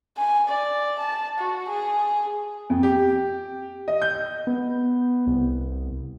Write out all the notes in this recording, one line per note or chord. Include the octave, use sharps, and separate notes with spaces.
G#5
D5
A5
F#4
G#4
F2
G4
D#5
G6
B3
C2